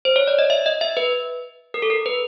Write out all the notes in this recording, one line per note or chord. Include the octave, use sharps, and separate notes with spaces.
C5
C#5
D5
D#5
E5
D#5
E5
B4
A#4
A4
A#4
B4